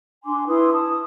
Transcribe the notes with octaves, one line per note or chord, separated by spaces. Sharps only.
D4 G#5 C6 D6
E4 B4 C6 D#6
A5 D#6